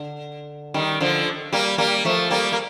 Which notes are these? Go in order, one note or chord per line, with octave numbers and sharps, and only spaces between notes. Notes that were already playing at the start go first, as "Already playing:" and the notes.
Already playing: D3
D#3 G3
D3 F3
G3 A#3
G3 A#3
F3 A3
G3 A#3
A#3